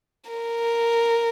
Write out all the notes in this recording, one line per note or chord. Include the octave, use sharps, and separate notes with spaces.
A#4